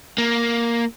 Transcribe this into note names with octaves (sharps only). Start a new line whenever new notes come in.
A#3